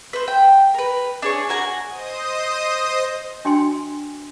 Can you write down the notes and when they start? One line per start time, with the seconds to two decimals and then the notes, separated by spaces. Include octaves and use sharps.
0.13 B4 C5
0.28 G5
0.74 A#4 B4
1.22 D4 G#4 C#5
1.49 F#4 A#4 F#5 G#5
1.88 C5 D#5 D#6
3.45 D4 F#4 G5 G#5 C6